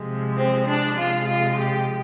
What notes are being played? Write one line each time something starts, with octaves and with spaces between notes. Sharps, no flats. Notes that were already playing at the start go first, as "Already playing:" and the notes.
Already playing: C3 F3 G#3
C4
D4
C3 F3 G#3 F4
F4
G4